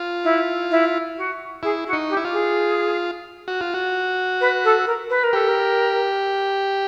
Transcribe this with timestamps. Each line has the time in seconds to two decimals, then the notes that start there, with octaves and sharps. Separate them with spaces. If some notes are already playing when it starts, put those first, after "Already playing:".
Already playing: F4
0.24 E4
0.71 E4
1.17 F#4
1.63 E4 G#4
1.86 F#4
1.93 D#4
2.09 G4
2.17 E4
2.25 F4
2.32 G#4
3.48 F#4
3.61 F4
3.74 F#4
4.40 B4
4.64 A4
4.86 A#4
5.10 B4
5.23 A#4
5.33 G4 A4
5.48 A#4